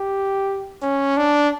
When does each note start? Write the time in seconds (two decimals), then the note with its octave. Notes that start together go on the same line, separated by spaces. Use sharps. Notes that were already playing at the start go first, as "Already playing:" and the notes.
Already playing: G4
0.82 C#4
1.17 D4